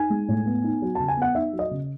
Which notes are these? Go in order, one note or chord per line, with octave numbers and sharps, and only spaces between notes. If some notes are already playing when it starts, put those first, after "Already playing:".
Already playing: D#4 G#5
G#3
A2
B3
D#4
F#3
C#3 A5
G#5
B3 F#5
D#4 E5
F#3
D#5
C#3